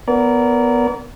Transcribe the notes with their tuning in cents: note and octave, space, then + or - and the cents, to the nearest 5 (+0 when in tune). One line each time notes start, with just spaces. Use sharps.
B3 +0 A#4 +0 D5 -35